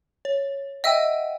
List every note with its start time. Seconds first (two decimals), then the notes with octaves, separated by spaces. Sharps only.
0.25 C#5
0.84 D#5 E5 F#5 G5 E6